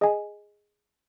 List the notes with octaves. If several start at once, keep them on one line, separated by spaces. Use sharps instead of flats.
G#4 D#5 G#5